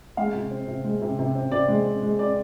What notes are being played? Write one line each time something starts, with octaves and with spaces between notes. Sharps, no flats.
G#3 F5
C3
C4
C3
G#3
C3
C3
C4
C3 D5
G#3
C4
G#3
C4 D5